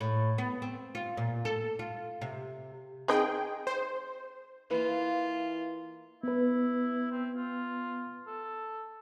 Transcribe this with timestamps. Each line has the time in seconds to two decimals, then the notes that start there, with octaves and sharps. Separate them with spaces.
0.01 A2
0.38 B3
0.62 C4
0.95 F4
1.17 A#2
1.45 A4
1.79 F4
2.21 C3
3.08 C4 D#4 G#4 D#5 G5
3.67 C5
4.71 E3 A#3 F4 B4 F5
6.23 B3 E4 B4
7.12 C4
7.35 F4
8.27 A4